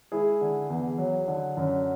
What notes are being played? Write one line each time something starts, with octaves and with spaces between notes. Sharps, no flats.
G#3 E4 G#4
D3
E2
F#3
D3
F#2